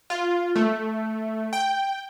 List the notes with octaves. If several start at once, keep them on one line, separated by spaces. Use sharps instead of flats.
F4
A3
G5